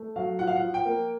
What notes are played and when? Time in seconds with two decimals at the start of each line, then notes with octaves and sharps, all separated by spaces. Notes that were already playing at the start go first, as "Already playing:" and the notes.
Already playing: A3
0.16 F#3 F5
0.39 F3 F#5
0.47 F5
0.56 F#5
0.62 F3
0.74 G5
0.85 A#3